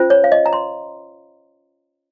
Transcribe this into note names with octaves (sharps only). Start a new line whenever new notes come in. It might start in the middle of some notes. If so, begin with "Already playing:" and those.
Already playing: C#4 F4 C5
C#5
F5
D#5
A#5
C6